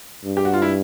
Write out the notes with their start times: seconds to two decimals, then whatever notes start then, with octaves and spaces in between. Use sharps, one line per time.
0.24 G2
0.37 G4
0.45 F#4
0.54 F4
0.62 E4